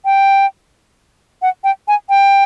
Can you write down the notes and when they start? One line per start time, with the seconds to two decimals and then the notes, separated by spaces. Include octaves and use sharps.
0.05 G5
1.42 F#5
1.64 G5
1.88 G#5
2.09 G5